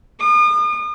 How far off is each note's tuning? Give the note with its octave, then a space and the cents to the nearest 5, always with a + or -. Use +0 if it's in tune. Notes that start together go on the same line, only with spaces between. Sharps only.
D#6 -40